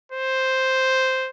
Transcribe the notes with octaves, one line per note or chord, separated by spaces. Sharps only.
C5